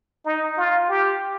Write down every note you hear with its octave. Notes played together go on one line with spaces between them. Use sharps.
D#4
F4
G4